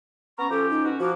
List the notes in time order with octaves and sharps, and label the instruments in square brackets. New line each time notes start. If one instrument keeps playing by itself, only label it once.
[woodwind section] B3 C#4 A#5 [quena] C#6
[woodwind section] F3 C#4 G4 [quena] A4
[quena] D#4
[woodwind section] B2 C#4 F#4
[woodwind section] F3 A#3 [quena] F#4